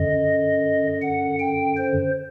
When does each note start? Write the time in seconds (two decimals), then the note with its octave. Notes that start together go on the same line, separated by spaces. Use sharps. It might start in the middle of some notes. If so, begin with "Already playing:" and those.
Already playing: F#2 D3 D#5
1.02 F#5
1.40 G5
1.77 C5